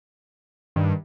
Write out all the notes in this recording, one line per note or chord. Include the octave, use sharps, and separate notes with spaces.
G2 D#3